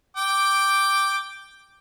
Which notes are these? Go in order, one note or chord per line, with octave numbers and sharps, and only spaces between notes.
G5 D6